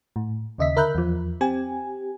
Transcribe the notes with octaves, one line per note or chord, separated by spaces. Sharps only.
A2
D#2 C#3 D#5 E5 B6
D3 A#4 E5 B5 F#6 G6
E2 F3
C4 G4 G#5